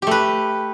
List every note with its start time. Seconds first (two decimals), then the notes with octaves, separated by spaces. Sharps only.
0.02 G4
0.07 A3
0.11 B4